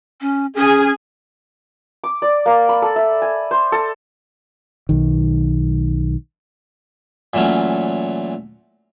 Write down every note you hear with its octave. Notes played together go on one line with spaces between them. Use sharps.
C#4
C#4 G#4 G#5
D6
D5
A#3
B5
A4
E5
G#5
C5
A4
B1 D#3
A#2 E3 F#3 A3 C#4